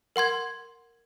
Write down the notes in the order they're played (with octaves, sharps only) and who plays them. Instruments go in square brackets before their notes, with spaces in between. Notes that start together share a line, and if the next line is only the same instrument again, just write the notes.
[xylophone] A#4 F#5 C6 G#6